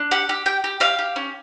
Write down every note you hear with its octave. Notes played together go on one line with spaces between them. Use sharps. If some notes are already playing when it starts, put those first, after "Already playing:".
Already playing: D4
G4 F#5
G4
G4 G5
G4
G4 F5
G4
C#4